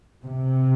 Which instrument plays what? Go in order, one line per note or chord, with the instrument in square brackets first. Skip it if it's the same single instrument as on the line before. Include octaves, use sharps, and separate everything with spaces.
[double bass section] C3